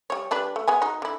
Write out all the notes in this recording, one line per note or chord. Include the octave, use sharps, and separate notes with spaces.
G3 C#5
G3 D4 B4
A3
G#3 B3 G#5
D#4 F#4
D3 E4